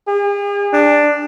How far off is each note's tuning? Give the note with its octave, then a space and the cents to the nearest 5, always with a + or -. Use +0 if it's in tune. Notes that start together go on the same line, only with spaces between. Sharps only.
G#4 -45
D4 +5